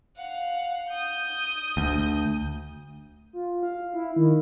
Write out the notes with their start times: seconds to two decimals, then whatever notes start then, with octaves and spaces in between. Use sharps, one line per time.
0.17 F5 F#5
0.90 D#6 G6
1.77 D2
3.33 F4
3.63 F5
3.94 E4
4.16 D#3